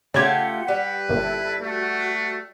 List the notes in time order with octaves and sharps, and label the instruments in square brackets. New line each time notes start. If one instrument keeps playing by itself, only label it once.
[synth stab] C#3 G#6 [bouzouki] A3 F4 G4 [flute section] F#5
[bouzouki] G3 [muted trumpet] B4
[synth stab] G1 A#2 [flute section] E4 A4 E5
[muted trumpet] A3 [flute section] F#4